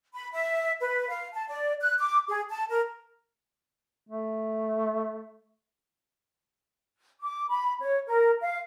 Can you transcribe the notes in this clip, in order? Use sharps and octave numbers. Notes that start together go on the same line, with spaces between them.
B5
E5
B4
F5
A5
D5
F#6
D6
G#4
A5
A#4
A3
D6
B5
C#5
A#4
F5